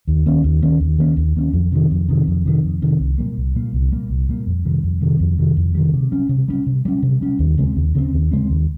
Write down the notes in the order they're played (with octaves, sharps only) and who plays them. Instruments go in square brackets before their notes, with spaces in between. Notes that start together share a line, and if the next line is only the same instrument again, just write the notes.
[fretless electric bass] D#2
D#3 A#3 C#4
D#2
D#3 A#3 C#4
D#2
D#3 A#3 C#4
D#2
D#3 A#3 C#4
F2
C3 D#3
F2
C3 D#3
F2
C3 D#3
F2
C3 D#3
C2
A#2 G3 A#3
C2
A#2 G3 A#3
C2
A#2 G3 A#3
C2
A#2 G3 A#3
F2
C3 D#3 G3
F2
C3 D#3 G3
F2
C3 D#3 G3
F2
C3 D#3 G3
C3
G3 C#4
C3
G3 C#4
C3
G3 C#4
C3
G3 C#4
D#2
C#3 G#3 C4
D#2
C#3 G#3 C4
D#2
C#3 G#3 C4
D#2